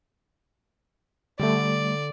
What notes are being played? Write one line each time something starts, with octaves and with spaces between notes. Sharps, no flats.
D3 G3 A3 D5